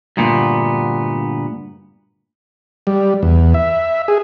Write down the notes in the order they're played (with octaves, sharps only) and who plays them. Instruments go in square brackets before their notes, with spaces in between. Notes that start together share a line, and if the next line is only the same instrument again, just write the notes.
[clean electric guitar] D2 G2 A#2 B3
[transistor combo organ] G3
E2
E5
G#4